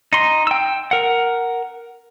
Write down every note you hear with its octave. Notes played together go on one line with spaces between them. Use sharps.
D#4 C6
G5 E6
A#4 F#5